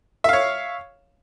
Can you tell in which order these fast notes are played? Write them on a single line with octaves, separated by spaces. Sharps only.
E5 F5 C#5